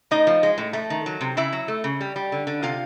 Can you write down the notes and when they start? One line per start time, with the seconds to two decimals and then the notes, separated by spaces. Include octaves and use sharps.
0.11 A2 D#4 D#5
0.27 F3
0.43 G#3
0.58 A2
0.73 A3
0.90 D#3
1.06 F#3
1.21 C3
1.37 C#3 E4 E5
1.53 F#3
1.68 A3
1.84 C#3
2.01 G3
2.16 G3
2.32 D3
2.47 D3
2.63 C3 F4 F5